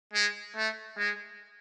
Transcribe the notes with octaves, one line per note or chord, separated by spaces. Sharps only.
G#3
A3
G#3